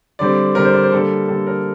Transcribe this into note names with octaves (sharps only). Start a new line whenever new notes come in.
D3 G3 C4 D5
D3 G3 C4 A#4
C5
D5
C5
D3 G3 A#3 A4
D3 G3 A#3 A4
A#4